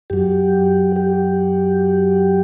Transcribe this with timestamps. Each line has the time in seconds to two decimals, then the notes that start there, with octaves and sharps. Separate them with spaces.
0.10 F#2 F#3 G4
0.96 G4